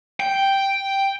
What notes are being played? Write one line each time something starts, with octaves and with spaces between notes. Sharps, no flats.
G5